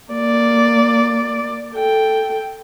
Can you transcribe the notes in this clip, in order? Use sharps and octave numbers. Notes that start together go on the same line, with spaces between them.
A#3 D5
A4 G5